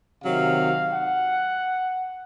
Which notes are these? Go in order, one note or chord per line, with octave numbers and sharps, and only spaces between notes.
C3 D#3 F#3 F5
F#5